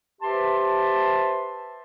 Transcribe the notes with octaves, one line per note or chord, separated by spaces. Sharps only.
G4 B4 C5 E5 A5 C6